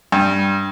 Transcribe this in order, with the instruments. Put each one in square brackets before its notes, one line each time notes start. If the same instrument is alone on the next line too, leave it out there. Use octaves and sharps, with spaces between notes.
[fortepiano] G2